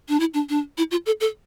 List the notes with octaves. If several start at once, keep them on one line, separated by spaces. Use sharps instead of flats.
D4
E4
D4
D4
E4
F4
A4
A4